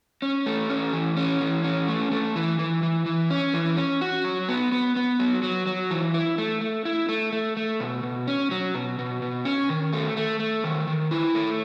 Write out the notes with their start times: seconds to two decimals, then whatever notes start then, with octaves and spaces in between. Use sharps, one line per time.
0.22 C#4
0.46 A3
0.70 C#4
0.93 E3
1.17 C#4
1.41 E3
1.64 C#4
1.88 A3
2.11 A3
2.36 E3
2.59 E3
2.83 E3
3.06 E3
3.31 C#4
3.54 E3
3.77 C#4
4.01 F#4
4.24 F#3
4.49 B3
4.72 B3
4.96 B3
5.20 F#3
5.43 F#3
5.67 F#3
5.91 E3
6.14 E4
6.38 A3
6.61 A3
6.85 E4
7.09 A3
7.32 A3
7.57 A3
7.80 B2
8.03 B2
8.27 C#4
8.51 F#3
8.75 B2
8.99 B2
9.22 B2
9.45 C#4
9.69 D#3
9.93 A3
10.17 A3
10.40 A3
10.64 D#3
10.87 D#3
11.11 E4
11.35 A3